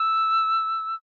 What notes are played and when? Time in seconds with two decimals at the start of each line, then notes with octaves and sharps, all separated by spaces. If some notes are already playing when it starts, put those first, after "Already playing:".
Already playing: E6